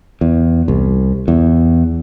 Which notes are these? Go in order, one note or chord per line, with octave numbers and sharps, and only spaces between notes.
E2
C2
E2